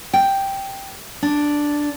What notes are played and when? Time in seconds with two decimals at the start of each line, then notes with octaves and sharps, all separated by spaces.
0.13 G5
1.23 D4